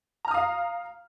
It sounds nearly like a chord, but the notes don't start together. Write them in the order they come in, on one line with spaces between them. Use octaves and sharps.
A#5 F6 D#6 F5